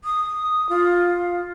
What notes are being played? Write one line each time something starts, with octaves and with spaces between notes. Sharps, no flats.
D#6
F4